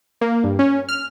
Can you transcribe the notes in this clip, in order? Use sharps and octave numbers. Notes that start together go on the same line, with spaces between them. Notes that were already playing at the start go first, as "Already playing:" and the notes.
A#3
G2
C#4
F6